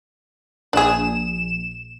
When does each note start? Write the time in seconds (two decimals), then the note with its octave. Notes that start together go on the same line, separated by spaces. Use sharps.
0.73 A#1 D4 G#4 E7